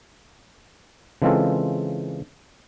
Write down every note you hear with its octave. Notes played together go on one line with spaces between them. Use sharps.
C#3 E3 G#3 C4 F4 A4